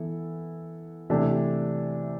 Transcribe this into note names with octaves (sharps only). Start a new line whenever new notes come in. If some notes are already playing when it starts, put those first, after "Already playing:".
Already playing: E3 B3 E4 A4
C3 E3 A3 D4 G4